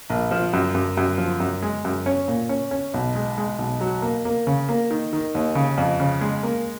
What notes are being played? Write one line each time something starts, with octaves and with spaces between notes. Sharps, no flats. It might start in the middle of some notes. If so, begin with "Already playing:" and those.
A#1
F3
F#2
F#2
F#2
F3
F#2
G#3
F#2
C#4
A#2
C#4
C#4
B1
G#3
G#3
B1
F#3
A#3
A#3
C#3
A#3
D#3
D#3
D#2
C#3
F2
C#3
G#3
A#3